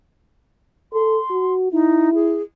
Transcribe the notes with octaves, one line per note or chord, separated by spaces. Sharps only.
A4 C6
F#4
D#4 E4
G#4